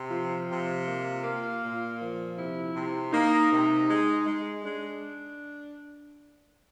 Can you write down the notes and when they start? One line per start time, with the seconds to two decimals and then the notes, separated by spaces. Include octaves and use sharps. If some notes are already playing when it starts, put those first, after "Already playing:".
Already playing: C3
0.11 F3 F4
0.49 C3
0.86 A#3
1.24 A#3
1.62 A#2
2.00 F3
2.37 C3 E4
2.74 C3
3.12 A#3 D#4
3.51 C3
3.88 G#3
4.25 G#3
4.64 G#3 D4